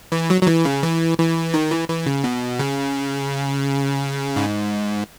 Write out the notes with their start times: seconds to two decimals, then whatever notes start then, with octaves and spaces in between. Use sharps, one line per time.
0.12 E3
0.30 F#3
0.43 F#3
0.47 E3
0.65 C#3
0.83 E3
1.18 E3
1.54 D#3
1.71 E3
1.89 E3
2.06 C#3
2.24 B2
2.59 C#3
4.36 G#2